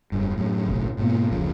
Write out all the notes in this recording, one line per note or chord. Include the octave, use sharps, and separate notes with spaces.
F1 G2
F#2 A2
F#1 B1 A2
G#2 B2 A#3
F1 C#2 F3